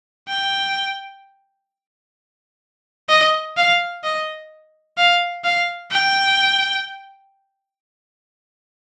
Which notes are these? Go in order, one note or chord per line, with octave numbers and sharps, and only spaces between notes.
G5
D#5
F5
D#5
F5
F5
G5